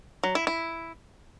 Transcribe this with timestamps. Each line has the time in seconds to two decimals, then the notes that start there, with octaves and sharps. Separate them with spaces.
0.24 F#3
0.35 E4
0.47 E4